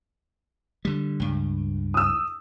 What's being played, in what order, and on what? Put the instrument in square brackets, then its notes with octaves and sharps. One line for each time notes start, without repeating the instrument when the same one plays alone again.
[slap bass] D3 G3
C#2 G2
[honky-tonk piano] D#6 E6